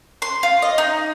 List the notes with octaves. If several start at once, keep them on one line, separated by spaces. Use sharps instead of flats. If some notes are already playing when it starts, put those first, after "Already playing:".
C6
F4
D#5
D#4